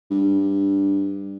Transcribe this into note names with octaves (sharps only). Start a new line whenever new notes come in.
G2